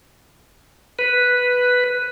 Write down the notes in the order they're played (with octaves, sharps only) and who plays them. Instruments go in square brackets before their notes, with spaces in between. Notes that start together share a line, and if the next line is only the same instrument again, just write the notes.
[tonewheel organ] B4